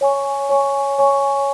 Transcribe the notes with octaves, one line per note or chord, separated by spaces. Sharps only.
C#5 G#5 C#6
C#5 G#5 C#6
C#5 G#5 C#6